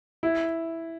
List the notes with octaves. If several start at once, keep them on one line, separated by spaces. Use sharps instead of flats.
E4